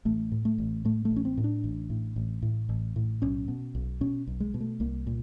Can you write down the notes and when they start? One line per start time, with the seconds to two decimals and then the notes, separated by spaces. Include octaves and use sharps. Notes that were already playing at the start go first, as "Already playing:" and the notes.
0.05 A1 A3
0.32 A2
0.45 A3
0.58 A1
0.85 A2 A3
1.05 A3
1.11 A1
1.16 C#4
1.25 C4
1.37 A2
1.44 D4
1.64 A1
1.90 A2
2.16 A1
2.42 A2
2.69 A1
2.96 A2
3.22 B1 C#4
3.48 B2
3.75 B1
4.01 B2 C#4
4.27 B1
4.40 G#3
4.54 B2
4.60 A3
4.80 C2 A#3
5.07 A#2